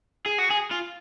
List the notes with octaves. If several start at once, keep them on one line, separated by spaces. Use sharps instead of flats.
G#4
F#4
G#4
F4